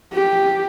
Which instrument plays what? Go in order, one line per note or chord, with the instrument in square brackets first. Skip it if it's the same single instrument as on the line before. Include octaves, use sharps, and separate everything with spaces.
[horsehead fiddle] G4